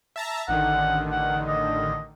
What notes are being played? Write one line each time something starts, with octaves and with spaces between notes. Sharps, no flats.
E5 A5 A#5
A1 D3 D#3 F#5
F#5
D#5